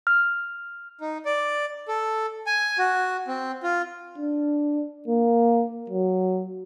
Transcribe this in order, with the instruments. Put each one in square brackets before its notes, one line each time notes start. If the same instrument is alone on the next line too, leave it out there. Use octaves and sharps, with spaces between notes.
[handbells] F6
[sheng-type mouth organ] D#4
D5
A4
G#5
F#4
C4
F4
[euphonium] D4
A#3
F#3